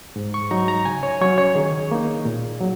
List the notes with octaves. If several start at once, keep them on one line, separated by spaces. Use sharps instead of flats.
G#2
C#6
F#3 D#4 A#5
A#5
C#3 G#5
C#5
F#3 C#4 C#5
C#5
D#3 G#4
A#3 D#4
A#2
F#3